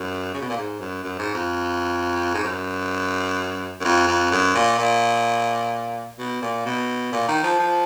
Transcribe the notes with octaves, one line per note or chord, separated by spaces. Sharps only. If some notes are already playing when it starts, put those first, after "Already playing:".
Already playing: F#2
C#3
B2
A#2
G#2
F#2
F#2
G#2
F2
G#2
F#2
F#2
F2
F2
F#2
A#2
A#2
B2
A#2
B2
A#2
D#3
F3
F3